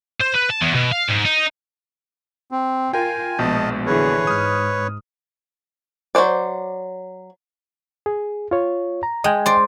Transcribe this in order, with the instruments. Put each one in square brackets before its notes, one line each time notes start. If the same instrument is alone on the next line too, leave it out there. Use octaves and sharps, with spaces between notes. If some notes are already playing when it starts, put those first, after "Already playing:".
[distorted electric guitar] C5
B4
A5
E2
B2
F5
G#2
D#4
[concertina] C4
[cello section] F4 [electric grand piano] A#4 G5 [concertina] G#5
[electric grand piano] A#1 B2 G6 [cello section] F3 G#3 B3 [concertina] D#5 A5
[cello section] D3 E3 G#4 [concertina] B4 C#5
[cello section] G#2 [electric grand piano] D#6 F6
[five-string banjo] F#3 A3 C5 D5
[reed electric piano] G#4
F4 C#5
A#5
[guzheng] G#3 [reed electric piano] D#5 G5 G#5
[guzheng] C5 D5